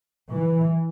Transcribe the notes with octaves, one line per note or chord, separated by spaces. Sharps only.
E3